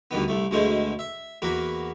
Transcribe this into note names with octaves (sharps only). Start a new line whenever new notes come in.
D2 G2 D#3 B3
C2 A3
D2 B2 G#3 A3 C5
E5
E2 A#3 F#4 B5